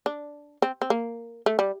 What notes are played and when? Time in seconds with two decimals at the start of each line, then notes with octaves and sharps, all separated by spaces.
0.06 D4
0.62 C4
0.82 C4
0.90 A#3
1.46 A3
1.59 G3